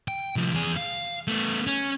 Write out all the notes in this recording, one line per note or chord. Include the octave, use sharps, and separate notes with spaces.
G5
C2 F3
E2 G#4
F5
A3 B3
C#4